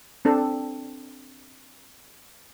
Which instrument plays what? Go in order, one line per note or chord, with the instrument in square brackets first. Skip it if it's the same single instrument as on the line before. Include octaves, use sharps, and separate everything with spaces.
[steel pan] C4 D4 A4